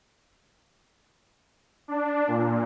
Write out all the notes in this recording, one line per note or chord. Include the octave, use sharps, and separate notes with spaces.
D4
A#2